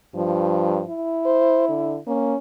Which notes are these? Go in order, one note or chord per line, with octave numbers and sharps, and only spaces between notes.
G2 F3
E4
C5
D3
A#3 C#4